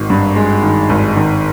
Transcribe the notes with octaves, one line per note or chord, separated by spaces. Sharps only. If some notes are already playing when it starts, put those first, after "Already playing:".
Already playing: G#1 D#3
G2
G#3
D#3
G#1
D#3